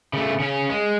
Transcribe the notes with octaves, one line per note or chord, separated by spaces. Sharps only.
C#3 A3
C#3 C#4
G#3